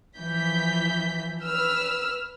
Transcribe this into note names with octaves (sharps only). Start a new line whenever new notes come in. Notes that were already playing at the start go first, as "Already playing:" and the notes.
E3 F3 G6 B6
B4 E6 F6